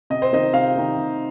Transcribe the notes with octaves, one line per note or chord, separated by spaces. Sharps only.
C3 D#5
C5
D#3 C4 D#4 D#5
C3 F5
D#3 C4 D#4
C3